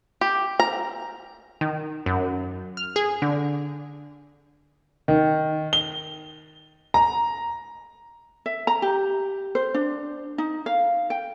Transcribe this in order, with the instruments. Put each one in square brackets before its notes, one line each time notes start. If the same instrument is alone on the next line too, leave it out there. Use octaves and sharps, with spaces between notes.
[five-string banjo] G4
A#5
[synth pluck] D#3
F#2
F6
G#4
D3
[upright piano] D#3
G7
A#5
[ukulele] E5
A#5
G4
C5
D4
D#4
F5
G5